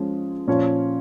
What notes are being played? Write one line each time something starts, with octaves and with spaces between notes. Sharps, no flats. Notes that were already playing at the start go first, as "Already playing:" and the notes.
Already playing: F3 G#3 C#4
A#2 F3 C#4 F4 C#5